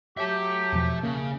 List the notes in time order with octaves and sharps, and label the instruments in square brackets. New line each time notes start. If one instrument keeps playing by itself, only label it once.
[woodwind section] F#3 G4 [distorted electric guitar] E5 A5
[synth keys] E2 B2 F3
[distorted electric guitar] C#3 [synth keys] A#3